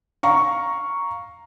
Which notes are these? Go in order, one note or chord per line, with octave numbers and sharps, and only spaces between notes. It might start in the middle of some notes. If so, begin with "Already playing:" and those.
F5 A#5 C#6